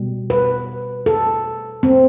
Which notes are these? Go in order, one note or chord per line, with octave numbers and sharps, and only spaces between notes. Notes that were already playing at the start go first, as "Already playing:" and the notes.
Already playing: B2 G3
B4
A4
C4